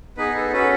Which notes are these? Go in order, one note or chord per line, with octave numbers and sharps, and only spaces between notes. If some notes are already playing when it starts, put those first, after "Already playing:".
B3 D#4 G#4 B4
A4
C#4 F#4 A4 B4